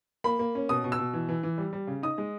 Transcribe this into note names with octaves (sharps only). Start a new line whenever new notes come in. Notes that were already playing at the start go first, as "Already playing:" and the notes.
A#3 B5
A#3
C#4
B2 D#6
B2
E6
B2
E3
E3
E3
G3
G3
C#3
D#4 D#6
G#3